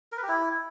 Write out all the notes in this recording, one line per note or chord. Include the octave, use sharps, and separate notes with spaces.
A#4
B4
G4
E4